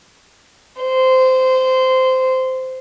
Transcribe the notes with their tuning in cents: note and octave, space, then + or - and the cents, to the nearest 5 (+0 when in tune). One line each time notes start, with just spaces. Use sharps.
C5 -15